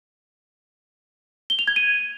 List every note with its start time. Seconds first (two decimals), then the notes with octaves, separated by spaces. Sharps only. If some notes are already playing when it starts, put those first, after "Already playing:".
1.50 G7
1.59 F7
1.67 G#6
1.76 D#7